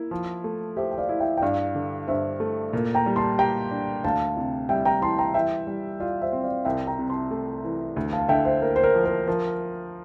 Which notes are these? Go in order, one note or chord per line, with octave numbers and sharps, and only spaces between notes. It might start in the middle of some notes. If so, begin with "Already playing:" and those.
Already playing: A#3 E4
F3
A3
G4 C5 E5
G5
D5 F5
E4
E5 G5
G5
G2 D5 F5
D3
G2 C5 E5
A3
A#2
G5 A#5
G3
A5 C6
G4 G5 A#5
D4
D2 F5 A5
C3
G3 E5 G5
G5 A#5
E3 A5 C6
G5 A#5
E3 E5 G5
G3
F4 D5 F5
C5 E5
C4
D5 F5
C2 E5 G5
G5 A#5
C3
A5 C6
A3
E3
D2
F5 A5
D3 E5 G5
C5 E5
A#3 A#4
C5
A#4
F3
A#4
F3 A#4